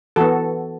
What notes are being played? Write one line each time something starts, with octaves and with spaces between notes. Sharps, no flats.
E3 B3 F#4 A4